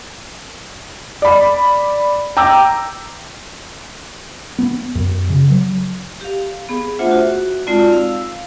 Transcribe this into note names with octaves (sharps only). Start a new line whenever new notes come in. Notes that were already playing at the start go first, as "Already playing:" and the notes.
D5 B5
G5 A#5 D6 E6
B3
F#2
C#3
F#3
G4 F5
B3 G#4
A3 D4 F4 C5 E5 F#5
F#4
G#3 C4 D#4 F4 D5 A5
F5 E6